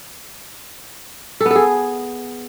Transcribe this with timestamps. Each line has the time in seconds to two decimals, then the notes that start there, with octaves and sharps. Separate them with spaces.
1.41 A4
1.46 B3
1.51 A4
1.56 G#4